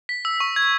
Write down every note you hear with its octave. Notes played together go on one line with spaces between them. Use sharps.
B6
E6
C#6
G#6